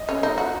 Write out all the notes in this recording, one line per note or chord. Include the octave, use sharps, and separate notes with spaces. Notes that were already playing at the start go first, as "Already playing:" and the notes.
Already playing: D#5
C#4
D#4
F#4